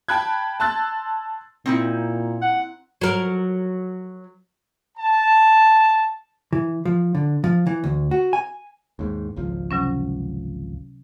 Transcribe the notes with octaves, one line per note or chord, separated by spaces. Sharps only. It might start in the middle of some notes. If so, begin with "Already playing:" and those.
G5 A5 B5 F#6 G#6
A5 C6 E6 F#6 A6
A#2 C4 D#4 E4
F#5
F#3 A#4
A5
E3
F3
D3
F3
E3
D2
F#4
G#5
D#2 G#2
G#1 C#2 F3
C3 F#3 C#4